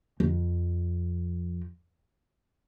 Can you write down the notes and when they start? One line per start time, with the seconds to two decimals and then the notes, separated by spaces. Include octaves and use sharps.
0.20 F2